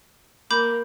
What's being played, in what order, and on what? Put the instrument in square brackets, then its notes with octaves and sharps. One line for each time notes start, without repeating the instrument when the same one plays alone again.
[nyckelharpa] A#3 [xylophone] B5 D6 G6